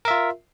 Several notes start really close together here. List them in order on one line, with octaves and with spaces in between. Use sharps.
A#4 E5 F4